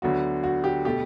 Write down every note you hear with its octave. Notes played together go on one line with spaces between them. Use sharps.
D2 D3 F#3 B3 F#4
F#4
G4
B2 A3 G4